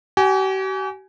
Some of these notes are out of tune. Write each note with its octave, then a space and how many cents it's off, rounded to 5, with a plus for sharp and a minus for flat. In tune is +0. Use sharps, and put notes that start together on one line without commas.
G4 -45 G#5 +0